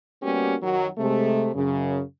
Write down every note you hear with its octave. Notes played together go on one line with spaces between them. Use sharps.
G3 A#3 B3 C#4 F#4 G4
F#2 D#3 F#3
C3 G#3 A3
F#2 C#3